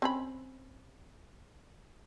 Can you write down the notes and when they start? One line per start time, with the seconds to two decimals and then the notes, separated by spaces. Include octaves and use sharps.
0.02 C4 C#4 B5